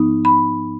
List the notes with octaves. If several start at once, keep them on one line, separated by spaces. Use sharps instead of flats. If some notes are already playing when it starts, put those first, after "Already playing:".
Already playing: G#2 F3 B3 D#4
B5